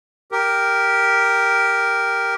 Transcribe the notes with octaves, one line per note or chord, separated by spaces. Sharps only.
G4 A#4